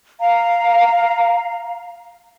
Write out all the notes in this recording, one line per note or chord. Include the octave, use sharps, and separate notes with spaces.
F5 A#5